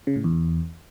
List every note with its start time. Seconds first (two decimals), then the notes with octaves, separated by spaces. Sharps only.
0.07 C#3
0.16 A2
0.24 E2